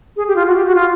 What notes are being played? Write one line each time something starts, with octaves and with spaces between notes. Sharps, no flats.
G#4
G4
F4
F#4
G4
F#4
F4